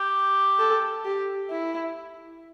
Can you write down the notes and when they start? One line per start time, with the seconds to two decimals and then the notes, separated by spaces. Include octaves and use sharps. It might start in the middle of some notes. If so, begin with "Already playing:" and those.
Already playing: G4
0.59 A4
1.05 G4
1.50 E4